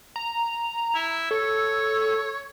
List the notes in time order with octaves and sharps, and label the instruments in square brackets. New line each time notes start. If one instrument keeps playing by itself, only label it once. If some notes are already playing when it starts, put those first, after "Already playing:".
[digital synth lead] A#5
[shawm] E4
[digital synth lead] A4 [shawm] C#5